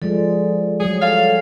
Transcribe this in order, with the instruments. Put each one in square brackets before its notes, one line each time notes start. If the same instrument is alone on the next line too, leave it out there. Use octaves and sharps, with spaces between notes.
[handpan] F3 G#3 [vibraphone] A4 D5
[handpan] F#3 G3 [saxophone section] G#4 [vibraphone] C#5
[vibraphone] G#4 A4 G#5 [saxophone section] F5